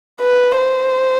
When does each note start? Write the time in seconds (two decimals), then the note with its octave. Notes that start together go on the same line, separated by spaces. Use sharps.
0.21 B4
0.58 C5